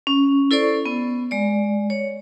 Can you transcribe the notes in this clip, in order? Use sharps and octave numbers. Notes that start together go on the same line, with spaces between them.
C#4
E4 A4 C5 D5 C#6
B3
G#3 D5
C#5